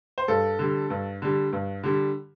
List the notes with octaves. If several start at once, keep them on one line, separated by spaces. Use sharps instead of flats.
C5
G2 A4
D3 G3
G2
D3 G3
G2
D3 G3